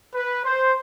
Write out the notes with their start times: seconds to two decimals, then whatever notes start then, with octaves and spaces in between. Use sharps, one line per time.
0.14 B4
0.43 C5